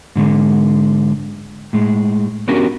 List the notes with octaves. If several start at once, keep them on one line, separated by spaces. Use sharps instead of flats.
G#2 D3 G#3
A2 G#3
B3 C#4 D4 F#4 G4 A#4